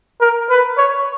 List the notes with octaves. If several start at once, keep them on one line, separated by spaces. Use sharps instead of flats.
A#4
B4
C#5